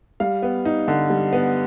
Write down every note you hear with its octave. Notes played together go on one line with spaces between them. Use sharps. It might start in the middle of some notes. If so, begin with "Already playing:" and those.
G3 F5
B3
D#4
D3
G3
B3